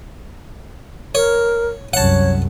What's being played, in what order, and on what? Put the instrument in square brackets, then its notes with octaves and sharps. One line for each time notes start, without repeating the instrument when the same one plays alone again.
[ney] A#4 [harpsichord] C#5
[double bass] C2 F#2 [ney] C#5 [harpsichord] F#5 A5